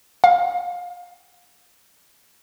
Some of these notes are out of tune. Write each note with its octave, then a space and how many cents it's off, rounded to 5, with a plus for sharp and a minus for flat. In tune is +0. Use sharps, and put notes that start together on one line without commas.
F5 +25